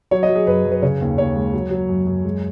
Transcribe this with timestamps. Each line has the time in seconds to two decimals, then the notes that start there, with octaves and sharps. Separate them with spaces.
0.11 F#3 C#5
0.23 D#5
0.29 F#3
0.35 G#4
0.47 F#2 B4
0.65 F#2
0.72 B4
0.82 C#3 C#5
1.01 D#2
1.18 D#2 C#5
1.36 G#3
1.53 F#3
1.71 F#3
1.89 F#2
2.07 F#2
2.25 G#3